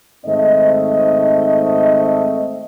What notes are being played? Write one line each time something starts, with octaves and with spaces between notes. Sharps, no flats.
G#2 D#3 A3 C4 D#5